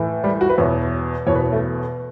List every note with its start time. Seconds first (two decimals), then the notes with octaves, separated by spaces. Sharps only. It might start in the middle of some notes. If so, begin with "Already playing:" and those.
Already playing: A2 E3
0.24 G3
0.41 F#4
0.49 B4
0.58 E2 B2 C#5
1.27 E2 B2 C#5
1.35 B4
1.52 A3